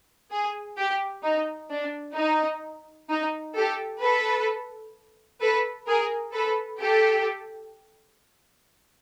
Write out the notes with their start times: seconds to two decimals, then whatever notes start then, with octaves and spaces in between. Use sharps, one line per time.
0.31 G#4
0.78 G4
1.24 D#4
1.70 D4
2.16 D#4
3.09 D#4
3.56 G4 A4
4.02 A4 B4
5.41 A4 B4
5.88 G#4 A#4
6.34 A4 B4
6.81 G4 A4